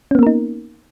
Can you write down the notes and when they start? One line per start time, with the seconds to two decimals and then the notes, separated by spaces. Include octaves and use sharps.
0.11 C#4
0.15 B3
0.19 A#3
0.23 A#4
0.27 D#4